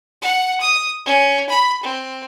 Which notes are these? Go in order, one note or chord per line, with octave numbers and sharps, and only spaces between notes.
F#5
D#6
C#4
B5
C4